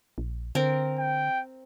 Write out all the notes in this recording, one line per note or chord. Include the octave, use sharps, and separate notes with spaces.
A#1
D3 C4 A#4
G5